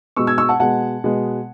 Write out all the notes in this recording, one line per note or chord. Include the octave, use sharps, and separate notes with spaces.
B2 G#3 B3 C#6 E6
E6 G#6
C#6 E6
F#5 A5
B2 G#3 B3 F#5 A5
B2 G#3 B3